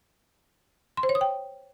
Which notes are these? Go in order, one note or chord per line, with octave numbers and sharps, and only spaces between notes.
C6
C5
C#5
D#6
G5